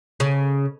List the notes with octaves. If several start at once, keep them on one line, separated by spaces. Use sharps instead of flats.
C#3